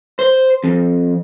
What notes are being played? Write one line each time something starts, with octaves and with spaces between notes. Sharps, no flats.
C5
F2